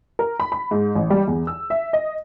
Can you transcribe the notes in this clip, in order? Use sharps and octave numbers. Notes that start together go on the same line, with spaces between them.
A#4
B5
B5
G#2
A1
G3
E2
E6
E5
D#5